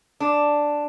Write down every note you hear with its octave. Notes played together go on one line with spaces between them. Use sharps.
D4